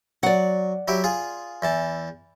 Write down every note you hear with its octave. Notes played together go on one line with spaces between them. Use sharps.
F#3 D5 F#5
F#3 E4 G4
F4 G#4
E2 E3 A5